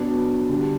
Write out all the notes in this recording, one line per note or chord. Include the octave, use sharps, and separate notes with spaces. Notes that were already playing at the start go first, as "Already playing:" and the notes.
Already playing: B2 F#3 B3 D4
D3 G3 D4